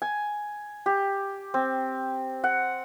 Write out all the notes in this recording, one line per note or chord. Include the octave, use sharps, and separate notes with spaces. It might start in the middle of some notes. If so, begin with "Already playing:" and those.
G#5
G4
C4
F#5